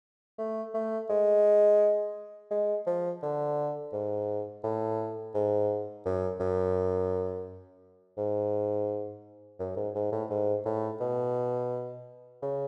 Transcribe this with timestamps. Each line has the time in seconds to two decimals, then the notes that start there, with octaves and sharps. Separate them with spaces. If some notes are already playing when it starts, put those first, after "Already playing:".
0.38 A3
0.74 A3
1.10 G#3
2.51 G#3
2.87 F3
3.22 D3
3.93 G#2
4.64 A2
5.34 G#2
6.05 F#2
6.40 F#2
8.17 G#2
9.59 F#2
9.77 G#2
9.95 G#2
10.12 A2
10.30 G#2
10.65 A2
11.01 B2
12.42 C#3